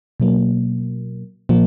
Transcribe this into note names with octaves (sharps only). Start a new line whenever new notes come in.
B2 F#3 A#3
A#2 F3 A#3